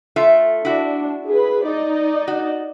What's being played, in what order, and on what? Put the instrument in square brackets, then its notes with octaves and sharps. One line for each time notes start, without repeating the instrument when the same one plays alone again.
[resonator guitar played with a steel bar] A3 F4 E5
[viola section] D4 [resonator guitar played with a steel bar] E4 F#4
[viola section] G#4 B4
D#4 D5 D#5
[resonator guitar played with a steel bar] F#4